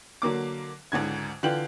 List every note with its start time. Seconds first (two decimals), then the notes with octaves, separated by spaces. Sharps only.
0.22 D3 F#3 A#3 D6
0.92 C#2 G#2 D3 G#6
1.43 D3 E3 F4 G5 F#7